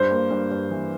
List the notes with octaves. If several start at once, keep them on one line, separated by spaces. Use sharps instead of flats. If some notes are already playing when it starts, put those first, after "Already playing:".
Already playing: G2 C5
A#3
G2
G2
E3